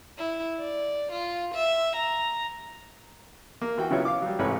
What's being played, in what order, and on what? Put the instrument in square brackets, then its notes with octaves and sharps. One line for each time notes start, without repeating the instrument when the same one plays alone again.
[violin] E4
D5
F4
E5
A#5
[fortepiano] A#3
E3 F#4 G5
C#3 F#3 B3 E4 F4 C#5
F5 D6
F#3 G3
A1 G#2 C3 B4 C#5 B5